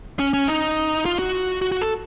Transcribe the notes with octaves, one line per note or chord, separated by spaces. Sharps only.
C#4
C#4
D#4
F4
F#4
F#4
F#4
A4